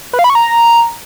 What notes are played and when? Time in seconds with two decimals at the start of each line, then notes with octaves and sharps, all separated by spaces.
0.13 B4
0.19 F5
0.24 B5
0.30 C#6
0.35 A#5